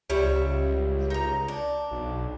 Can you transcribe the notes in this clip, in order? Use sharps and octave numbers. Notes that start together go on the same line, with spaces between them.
C#2 G3 C#5 E5
D#4 A#5
D4
B1